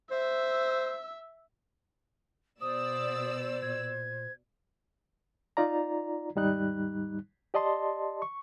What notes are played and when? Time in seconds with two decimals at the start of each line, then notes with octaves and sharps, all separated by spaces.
0.11 C5 E5 E6
2.61 B2 C5 D5 D#6 E6
3.62 A#2 G#6
5.57 D#4 F4 D5 A#5
6.35 D#2 G#2 G3 D#4 F#6
7.54 G4 D5 D#5 A5 C6
8.22 C#6